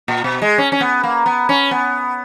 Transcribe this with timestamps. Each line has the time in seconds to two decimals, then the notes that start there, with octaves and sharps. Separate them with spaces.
0.08 A#2
0.24 B2
0.42 G#3
0.58 C#4
0.72 C#4
0.80 B3
1.03 A#3
1.26 B3
1.49 C#4
1.71 B3